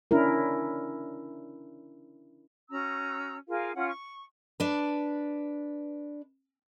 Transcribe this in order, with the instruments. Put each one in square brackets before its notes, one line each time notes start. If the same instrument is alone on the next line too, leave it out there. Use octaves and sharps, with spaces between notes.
[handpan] C#4 D4 E4 A#4
[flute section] C#4 F#4 A#5 E6
F4 G#4 A#4 F5
C#4 F4 F#5
C#6
[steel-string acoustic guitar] D4 B4